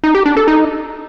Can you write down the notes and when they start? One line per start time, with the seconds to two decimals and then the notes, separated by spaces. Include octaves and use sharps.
0.04 D#4
0.15 G4
0.26 D4
0.37 A4
0.48 D#4